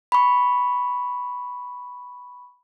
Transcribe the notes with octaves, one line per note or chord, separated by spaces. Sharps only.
B5 C#6